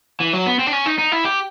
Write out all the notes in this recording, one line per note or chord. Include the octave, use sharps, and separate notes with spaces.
E3
F#3
B3
C4
D4
C#4
D#4
D#4
E4
G4